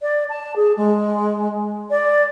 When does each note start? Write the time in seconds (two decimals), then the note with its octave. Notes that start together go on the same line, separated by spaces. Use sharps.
0.01 D5
0.29 A5
0.56 G#4
0.77 G#3
1.90 D5